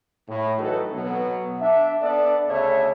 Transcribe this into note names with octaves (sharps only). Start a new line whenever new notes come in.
A2
E3 F#3 D#4 F#4 A4 B4
B2 F#3 B3
D4 E5
B3 D4 A4 D5
D2 C#3 A4 C#5 E5